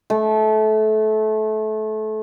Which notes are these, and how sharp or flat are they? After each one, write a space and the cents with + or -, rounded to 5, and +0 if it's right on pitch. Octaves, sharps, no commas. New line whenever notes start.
A3 -25